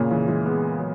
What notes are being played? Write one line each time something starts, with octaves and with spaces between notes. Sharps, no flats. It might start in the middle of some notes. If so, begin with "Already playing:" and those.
Already playing: A#2 C#3
C#3 E3
E3 G#3
G#3 B3
F#3